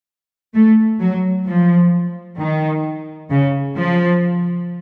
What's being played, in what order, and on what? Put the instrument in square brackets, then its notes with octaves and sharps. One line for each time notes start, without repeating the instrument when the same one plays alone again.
[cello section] A3
F#3
F3
D#3
C#3
F3